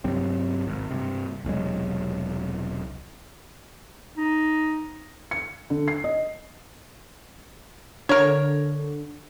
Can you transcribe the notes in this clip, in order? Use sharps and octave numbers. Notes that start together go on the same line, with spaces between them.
C2 G2 F#3 C4
G#1
G2 C3
E1 C2 F#3 G#3
D#4
C#7
D3
C7
D#5
D3 A#4 C#5